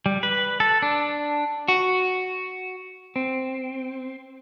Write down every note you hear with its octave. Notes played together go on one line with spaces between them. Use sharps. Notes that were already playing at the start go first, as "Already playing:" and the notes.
G3
B4
A4
D4
F#4
C4